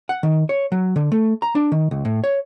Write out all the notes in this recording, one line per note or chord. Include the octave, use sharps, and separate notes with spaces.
F#5
D#3
C#5
F#3
D3
A3
A#5
D4
D#3
C#2
A2
C#5